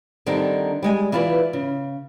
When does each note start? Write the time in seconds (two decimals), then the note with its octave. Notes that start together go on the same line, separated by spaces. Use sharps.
0.26 D3 D#3 G3 C4 D4 D#4
0.83 G3 G#3 G#5
1.12 E3 E4 F4 B4 D5
1.53 C#3